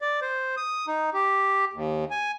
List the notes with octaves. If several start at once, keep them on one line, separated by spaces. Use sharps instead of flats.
D5
C5
D#6
D#4
G4
D#2
G#5